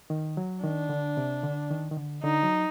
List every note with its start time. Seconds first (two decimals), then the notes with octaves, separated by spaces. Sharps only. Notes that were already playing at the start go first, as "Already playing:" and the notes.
0.10 D#3
0.37 F#3
0.63 D#3 D4
0.89 D3
1.17 C3
1.43 D3
1.71 D#3
1.91 D#3
1.97 D3
2.23 D3 D#4
2.43 F#3